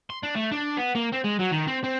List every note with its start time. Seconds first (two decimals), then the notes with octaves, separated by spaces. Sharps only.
0.10 C6
0.23 D4
0.35 A3
0.52 D4
0.77 B3
0.95 A#3
1.12 C4
1.24 G#3
1.39 F#3
1.51 D#3
1.67 C4
1.84 C4